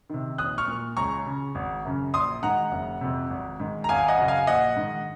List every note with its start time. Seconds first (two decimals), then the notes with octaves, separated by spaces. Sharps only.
0.10 C3 D#3
0.38 A#1 D#6 F#6
0.58 C#6 F6
0.68 A#2
0.97 C#2 A#5 C#6
1.26 C#3
1.55 G#1
1.85 F#2 C#3
2.14 A#1 C6 D#6
2.43 G#2 D#3 F#5 A#5
2.72 F#1
3.01 F2 C3
3.30 G#1
3.60 G#2 D#3
3.84 A#5
3.89 G#1 F5 G#5
4.08 D#5 F#5
4.18 F#2 C#3
4.28 F5 G#5
4.47 A#1 D#5 F#5
4.76 G#2 D#3